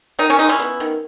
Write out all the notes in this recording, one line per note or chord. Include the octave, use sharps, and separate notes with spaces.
D#3 D#4
C#4
G#3 D#4
C#4 E4
B3
D#3